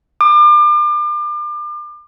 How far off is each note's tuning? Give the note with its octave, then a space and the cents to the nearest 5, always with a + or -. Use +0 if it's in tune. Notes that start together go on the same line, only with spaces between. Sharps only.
D6 +35